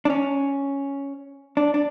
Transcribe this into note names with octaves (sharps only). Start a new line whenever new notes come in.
D4
C#4
D4
D4